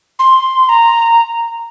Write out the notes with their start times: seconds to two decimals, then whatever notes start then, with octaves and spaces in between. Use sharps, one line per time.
0.19 C6
0.69 A#5